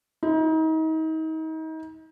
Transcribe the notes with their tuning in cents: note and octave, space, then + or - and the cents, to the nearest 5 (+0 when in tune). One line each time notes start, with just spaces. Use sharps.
D#4 +35